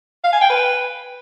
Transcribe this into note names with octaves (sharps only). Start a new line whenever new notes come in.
F5
G#5
G5
B4